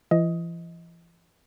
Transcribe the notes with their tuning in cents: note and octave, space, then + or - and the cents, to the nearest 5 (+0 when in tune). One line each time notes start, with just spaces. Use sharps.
E3 +45 D#5 +15